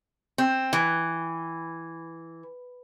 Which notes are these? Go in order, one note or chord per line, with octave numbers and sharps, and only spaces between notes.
C4
E3